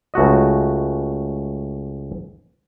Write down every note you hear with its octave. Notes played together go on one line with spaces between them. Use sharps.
C#2 A3 F#4 D#5